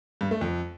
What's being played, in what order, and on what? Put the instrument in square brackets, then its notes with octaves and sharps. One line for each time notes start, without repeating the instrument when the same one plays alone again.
[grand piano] G2
A3
F2